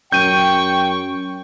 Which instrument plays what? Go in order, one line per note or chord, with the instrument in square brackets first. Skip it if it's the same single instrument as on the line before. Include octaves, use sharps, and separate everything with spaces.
[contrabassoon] F#2 [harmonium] G5 [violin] C#6 [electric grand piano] G6 D#7